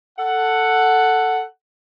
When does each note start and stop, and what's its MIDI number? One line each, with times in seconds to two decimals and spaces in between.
0.18 1.42 69
0.18 1.42 78